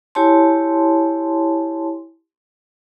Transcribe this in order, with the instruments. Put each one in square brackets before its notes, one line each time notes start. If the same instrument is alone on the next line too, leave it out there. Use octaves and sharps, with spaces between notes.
[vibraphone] E4 G4 C#5 G#5 A5 C6